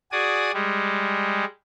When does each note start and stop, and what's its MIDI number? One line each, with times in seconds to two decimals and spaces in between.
0.12 0.51 66
0.12 0.51 68
0.12 0.51 74
0.12 0.51 80
0.12 0.51 87
0.54 1.45 55
0.54 1.45 56